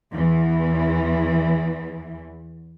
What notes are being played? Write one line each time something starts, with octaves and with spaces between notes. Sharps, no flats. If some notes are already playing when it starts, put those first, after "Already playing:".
E2 E3